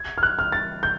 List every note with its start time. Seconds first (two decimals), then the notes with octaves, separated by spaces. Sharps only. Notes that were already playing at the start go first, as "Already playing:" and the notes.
Already playing: G#6
0.18 F6
0.23 F#6
0.39 F6
0.52 A6
0.83 G6